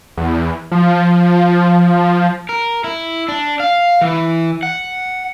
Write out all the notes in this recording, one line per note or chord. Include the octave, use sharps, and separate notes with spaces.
E2
F3
A#4
E4
D4
F5
E3
F#5